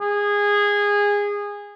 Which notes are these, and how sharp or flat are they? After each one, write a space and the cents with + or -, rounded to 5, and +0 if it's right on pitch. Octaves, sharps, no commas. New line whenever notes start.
G#4 -20